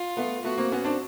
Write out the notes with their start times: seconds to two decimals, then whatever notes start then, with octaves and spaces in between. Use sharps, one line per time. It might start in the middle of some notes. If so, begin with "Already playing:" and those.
Already playing: F4
0.17 A3 B3
0.44 A3 B3 F#4
0.57 A#3 C4
0.72 B3 C#4
0.84 C4 D4